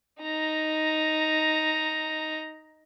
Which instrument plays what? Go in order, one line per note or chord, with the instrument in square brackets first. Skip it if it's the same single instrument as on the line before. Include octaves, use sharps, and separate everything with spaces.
[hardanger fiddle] D#4 A#5